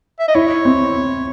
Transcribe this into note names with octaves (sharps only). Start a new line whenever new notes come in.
E5
D#5
E4 C#5
C4